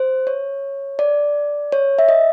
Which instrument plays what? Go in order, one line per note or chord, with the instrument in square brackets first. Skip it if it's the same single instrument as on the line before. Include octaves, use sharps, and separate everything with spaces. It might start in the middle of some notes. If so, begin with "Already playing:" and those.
Already playing: [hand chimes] C5
C#5
D5
C#5
E5
D#5